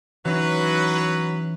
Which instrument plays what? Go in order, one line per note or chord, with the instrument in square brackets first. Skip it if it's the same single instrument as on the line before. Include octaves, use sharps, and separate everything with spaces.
[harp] E3 C#4 D#4 [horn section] F#3 B4